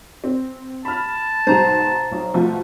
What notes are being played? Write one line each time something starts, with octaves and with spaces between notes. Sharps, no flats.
C4
A5 B5 F6
G#2 B2 G#3 C5 A#5
B1
B2 F3 A3